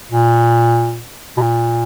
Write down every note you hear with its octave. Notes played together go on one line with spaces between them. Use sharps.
A#2
B2
A#2